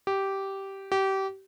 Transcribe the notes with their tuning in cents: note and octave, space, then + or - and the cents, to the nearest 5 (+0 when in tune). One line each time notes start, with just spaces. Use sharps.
G4 -10
G4 -25